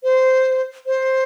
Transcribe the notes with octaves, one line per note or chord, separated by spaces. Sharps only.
C5
C5